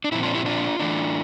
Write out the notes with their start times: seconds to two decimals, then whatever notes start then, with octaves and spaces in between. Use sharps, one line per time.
0.04 D4
0.12 A#2 F3 C4 E4
0.23 D4 F4
0.34 E4 G4
0.46 D4 F4
0.79 E3 A3 D4